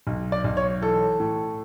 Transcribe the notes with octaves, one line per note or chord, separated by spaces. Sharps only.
B1
D5
B1
C#5
E3 A4
A2